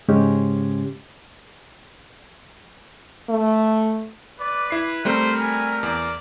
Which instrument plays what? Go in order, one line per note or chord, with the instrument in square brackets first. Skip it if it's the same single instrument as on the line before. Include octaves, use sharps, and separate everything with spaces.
[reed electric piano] G#2 C#3 G#3 C#4 G4
[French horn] A3
[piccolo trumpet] B4 [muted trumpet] D5
[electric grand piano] E4 C7
[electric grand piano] G3 A3 C4 [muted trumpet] A#4 [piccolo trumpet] C5
[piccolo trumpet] G#5
[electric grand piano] E2 [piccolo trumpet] D5